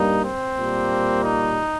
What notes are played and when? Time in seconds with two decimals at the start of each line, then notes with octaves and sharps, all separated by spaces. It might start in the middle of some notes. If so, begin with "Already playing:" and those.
Already playing: G2 G3 A#3 D#4
0.24 C4
0.57 A#2 G3 A#3
1.23 D#4